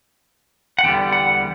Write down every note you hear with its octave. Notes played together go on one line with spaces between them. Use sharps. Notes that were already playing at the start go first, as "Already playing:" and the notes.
F#5
E2 D3 G3 B3 G5
F#5